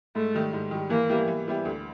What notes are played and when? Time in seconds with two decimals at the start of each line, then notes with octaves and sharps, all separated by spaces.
0.15 G#2 A3
0.35 D#3 G3
0.53 G#2
0.71 D#3 G3
0.90 E3 A#3
1.09 G3 B3 E4 G4
1.28 E3
1.48 G3 B3 E4 G4
1.65 D2